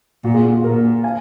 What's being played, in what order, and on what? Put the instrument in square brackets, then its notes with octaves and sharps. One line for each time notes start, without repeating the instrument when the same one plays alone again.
[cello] A#2 [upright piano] F#4
[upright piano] F4 G#4
F#4
F4 G#4
[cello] A#2 [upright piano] F#4 A#4
[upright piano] F5 G#5